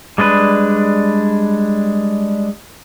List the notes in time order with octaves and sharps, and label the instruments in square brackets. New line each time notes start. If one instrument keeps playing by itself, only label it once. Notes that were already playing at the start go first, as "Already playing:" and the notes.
[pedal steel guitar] G3 G#3 D4 B4